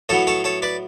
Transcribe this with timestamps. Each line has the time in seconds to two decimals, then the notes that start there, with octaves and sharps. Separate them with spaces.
0.09 A2 F#3 B3 A4 C#5
0.27 A4 C#5
0.44 A4 C#5
0.62 B4 D5